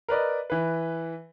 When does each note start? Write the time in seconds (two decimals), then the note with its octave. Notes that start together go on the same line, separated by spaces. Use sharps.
0.09 A#4 B4 D5 D#5
0.50 E3 B4